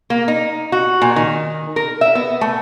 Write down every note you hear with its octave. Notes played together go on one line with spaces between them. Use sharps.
A#3
D#4
F#4
A#2
D#3
A#4
E5
B3
A3